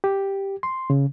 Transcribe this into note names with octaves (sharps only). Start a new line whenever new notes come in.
G4
C6
C#3